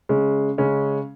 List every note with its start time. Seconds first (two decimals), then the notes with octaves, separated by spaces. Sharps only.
0.09 C#3 G#3 C#4
0.58 C#3 G#3 C#4